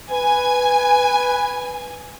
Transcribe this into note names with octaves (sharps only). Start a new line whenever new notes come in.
B4 G#5